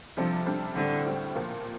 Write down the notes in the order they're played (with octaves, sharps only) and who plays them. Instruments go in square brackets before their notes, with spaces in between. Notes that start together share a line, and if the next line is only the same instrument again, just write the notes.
[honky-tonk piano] C3 G3 D4 A4 C5 [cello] F3
[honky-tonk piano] C3 G3 D4 A4 C5
[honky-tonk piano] A2 G3 C4 [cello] D3
[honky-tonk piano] A2 G3 C4
A#2 F3 A#3 F4